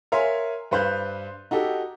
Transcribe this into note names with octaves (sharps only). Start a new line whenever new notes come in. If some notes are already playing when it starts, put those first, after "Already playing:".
A#4 C#5 E5 F5 G#5 C6
G2 B4 C5 F5 F#6 G6
D#4 F#4 G4 A4